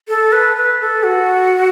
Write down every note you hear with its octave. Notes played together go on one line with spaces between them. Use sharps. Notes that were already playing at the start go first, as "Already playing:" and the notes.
A4
B4
B4
A4
F#4